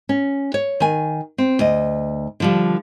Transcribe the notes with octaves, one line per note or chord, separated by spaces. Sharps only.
C#4
C#5
D#3 G#5
C4
D2 D#5
D3 F3 G3